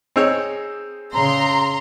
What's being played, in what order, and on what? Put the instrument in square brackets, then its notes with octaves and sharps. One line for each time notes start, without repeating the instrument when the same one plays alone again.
[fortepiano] C4 D#4 C#5 [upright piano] G#4 E6
[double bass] C#3 [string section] A#5 C6